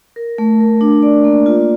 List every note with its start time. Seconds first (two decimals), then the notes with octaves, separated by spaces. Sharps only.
0.16 A#4
0.38 A3
0.60 A#4
0.81 D4
1.02 D5
1.24 A#3
1.46 F4